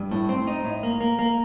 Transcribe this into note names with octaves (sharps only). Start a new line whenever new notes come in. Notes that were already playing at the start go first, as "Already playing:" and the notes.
Already playing: G2
A2
C4
D#4
A2
A#3
A#3
A#3